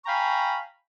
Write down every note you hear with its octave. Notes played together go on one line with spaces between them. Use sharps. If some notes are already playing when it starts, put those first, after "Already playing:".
F5 G5 G#5 A#5 B5 C#6